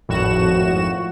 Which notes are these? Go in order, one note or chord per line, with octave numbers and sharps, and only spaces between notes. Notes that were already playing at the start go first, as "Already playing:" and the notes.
G#1 F2 A2 F#4 E7